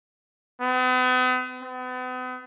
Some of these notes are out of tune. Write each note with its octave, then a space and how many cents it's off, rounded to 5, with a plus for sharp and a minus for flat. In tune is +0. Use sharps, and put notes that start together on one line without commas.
B3 +45
B3 +40